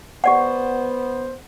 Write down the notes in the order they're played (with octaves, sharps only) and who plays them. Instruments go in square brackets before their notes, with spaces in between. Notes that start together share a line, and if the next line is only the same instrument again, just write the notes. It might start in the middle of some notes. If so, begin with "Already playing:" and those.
[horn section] B3 C5 [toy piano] G4 D5 F#5